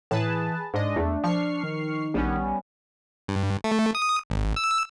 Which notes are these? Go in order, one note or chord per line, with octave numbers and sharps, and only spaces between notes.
A2 E3 G#4 B4 A5
G#2 G#3 D4 D#5
E2 A3
F3 C#6 F6 C7
D#3
A#1 G3 B3 C#4
G2
A3
D#6
G#1
E6